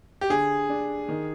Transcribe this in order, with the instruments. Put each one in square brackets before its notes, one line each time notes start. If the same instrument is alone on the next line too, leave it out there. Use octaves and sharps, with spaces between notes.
[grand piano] G4
[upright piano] D3 [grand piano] G#4
[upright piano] D4
D#3